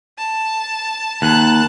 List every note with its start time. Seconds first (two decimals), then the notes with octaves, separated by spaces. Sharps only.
0.18 A5
1.22 D#2 A5 F#6